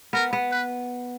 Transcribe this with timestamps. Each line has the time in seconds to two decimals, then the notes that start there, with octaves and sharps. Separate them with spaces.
0.13 B3 A#4
0.33 B3
0.51 B4